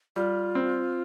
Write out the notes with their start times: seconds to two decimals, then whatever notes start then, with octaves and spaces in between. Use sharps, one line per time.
0.16 G3 F4
0.55 C4